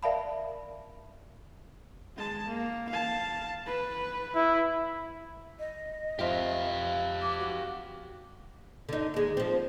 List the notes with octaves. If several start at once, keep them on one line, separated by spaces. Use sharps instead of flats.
A#4 D5 E5 F5 A5 B5
G#3 A5
A#3
F5 A5
B4
E4
D#5
F2 F4 G4 E5 F5
D6
F#4
D3 D#4
D#2 G#3
F3 C4